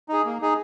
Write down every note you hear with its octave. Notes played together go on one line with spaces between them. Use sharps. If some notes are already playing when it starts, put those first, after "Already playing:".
D#4 G#4
A#3
D#4 G#4